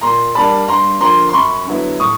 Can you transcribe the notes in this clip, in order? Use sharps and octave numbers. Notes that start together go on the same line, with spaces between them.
A#2 A#5 C6
G3 A#3 D4 A5 B5
G2 A#5 C6
D3 F3 A#3 A#5 C6
C6
F#2 B5 C#6
D3 F#3 B3 E4
A2 C#6 D#6